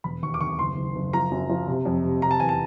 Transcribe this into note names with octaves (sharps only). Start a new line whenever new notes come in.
E1 B5
D#2 C#6
D6
D#2 C#6
F#1 C6
F#1
F#1
F3 A#5
F#2
F3
C3
F2
C3
C3 A#5
A5
E2 G#5
A5